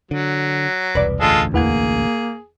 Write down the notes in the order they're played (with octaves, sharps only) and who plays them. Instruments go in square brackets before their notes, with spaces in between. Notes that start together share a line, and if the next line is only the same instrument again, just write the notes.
[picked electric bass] D3 [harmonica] F#3
[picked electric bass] E1 C2 [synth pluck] B4 D5
[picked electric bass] E1 A1 D2 [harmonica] G#3 F4 A4
[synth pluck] E2 F#5 G#6 [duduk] A#3 [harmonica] G#4